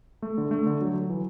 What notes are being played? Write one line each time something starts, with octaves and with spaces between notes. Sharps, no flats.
A3
D3
A3
D3
F#3
F#3
E3